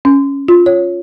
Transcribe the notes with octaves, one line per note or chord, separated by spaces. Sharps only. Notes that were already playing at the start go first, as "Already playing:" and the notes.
C#4
F4
C#5